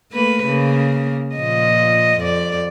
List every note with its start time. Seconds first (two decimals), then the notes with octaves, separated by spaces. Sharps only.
0.12 A3 A#3 B4
0.46 C#3 A#3
1.36 A#2 F3 D#5
2.20 F2 D5